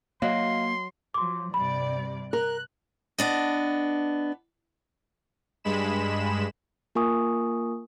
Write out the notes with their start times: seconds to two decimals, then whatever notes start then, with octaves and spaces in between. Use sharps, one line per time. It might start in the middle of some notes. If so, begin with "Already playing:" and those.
0.22 F#3 A#3 D#5 F5 C6
1.14 F3 F#3 C6 D6
1.54 G2 C3 D5 B5
2.33 A#4 F#6
3.18 B3 D4 D#5
5.64 G2 G#3 B5 E7
6.95 A#3 F4 A#4 G#5 C#6 D#6